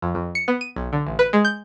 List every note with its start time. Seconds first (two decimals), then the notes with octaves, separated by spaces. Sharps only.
0.02 F2
0.15 F2
0.35 C#7
0.48 B3
0.61 D#7
0.76 B1
0.93 D3
1.07 A1
1.19 B4
1.33 G#3
1.45 G6